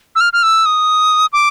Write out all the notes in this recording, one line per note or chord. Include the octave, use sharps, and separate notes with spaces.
E6
F6
F6
E6
D#6
D6